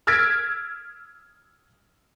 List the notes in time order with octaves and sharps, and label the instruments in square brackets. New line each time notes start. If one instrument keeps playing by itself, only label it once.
[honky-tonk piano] E6 F6 G#6 A6 B6 D7